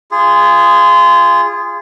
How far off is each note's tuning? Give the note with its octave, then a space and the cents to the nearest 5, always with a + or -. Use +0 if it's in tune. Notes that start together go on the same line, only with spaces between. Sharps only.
F4 -25 G#4 -15